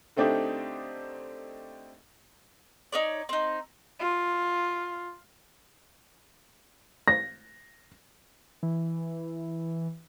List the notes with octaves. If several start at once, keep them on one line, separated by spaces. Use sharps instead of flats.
D3 A3 C4 D4 D#4 G4
D#4 C#5 D5
C4 D#4
F4
A#6
E3